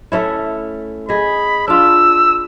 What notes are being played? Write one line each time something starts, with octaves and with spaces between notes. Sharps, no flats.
A3 C#4 E4
G#4 D#5 B5
D4 F4 E6